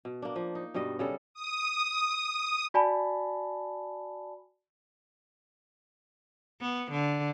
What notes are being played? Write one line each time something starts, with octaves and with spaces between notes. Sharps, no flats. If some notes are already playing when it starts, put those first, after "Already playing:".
B2
A#3 D4
F3
D#4
G2 B2 G3 D#5
C#3 G3 A4
D#6
F#4 D5 G#5 A5 B5
B3
D3